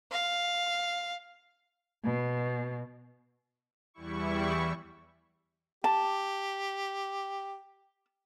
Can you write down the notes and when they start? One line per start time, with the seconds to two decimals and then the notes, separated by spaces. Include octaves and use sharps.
0.12 F5
2.05 B2
3.94 E2 E3 G3 E4 C#6
5.84 G4 A5